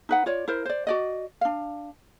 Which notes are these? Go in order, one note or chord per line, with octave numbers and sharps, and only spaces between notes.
D#4 B4 F#5
F4 C#5 D5
E4 A#4 C5
C5 D5
F#4 D5 D#5
D4 F5